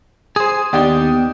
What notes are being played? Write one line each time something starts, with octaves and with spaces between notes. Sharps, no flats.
G#4 C5 D#6
D#2 B3 D4 D#4 G4